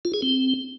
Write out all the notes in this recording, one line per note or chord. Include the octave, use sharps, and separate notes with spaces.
F4
G#4
C4